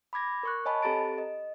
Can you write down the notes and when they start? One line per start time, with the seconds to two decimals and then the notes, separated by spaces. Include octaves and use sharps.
0.13 B5 D6 G#6 A#6
0.43 A#4 C#6 F#6
0.65 C#5 D#5 G#5 A5 B5
0.82 C4 G4 A4 A#5 A6 D7
1.18 D#5